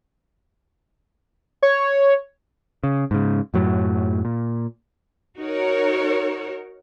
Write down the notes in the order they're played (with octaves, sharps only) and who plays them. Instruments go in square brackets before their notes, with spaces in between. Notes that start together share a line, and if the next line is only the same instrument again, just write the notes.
[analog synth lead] C#5
[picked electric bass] C#3
G#2 C#3
F#2 A2 F#3
A#2
[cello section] D#4 F#4 A#4 C#5